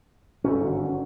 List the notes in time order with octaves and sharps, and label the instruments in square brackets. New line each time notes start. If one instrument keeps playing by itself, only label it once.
[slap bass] G1 G#2 C#4 [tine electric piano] F#4 A4
[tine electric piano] G#1 D4 F#5